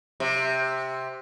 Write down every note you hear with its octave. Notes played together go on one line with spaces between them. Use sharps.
C3